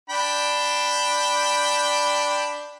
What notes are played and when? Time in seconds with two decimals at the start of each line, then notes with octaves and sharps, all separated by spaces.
0.10 D4 G5 B5